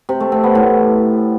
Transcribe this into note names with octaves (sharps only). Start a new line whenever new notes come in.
C3
A3
C4
B3
A2